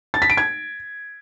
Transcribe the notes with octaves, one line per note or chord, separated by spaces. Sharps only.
A6
B6
D7
G#6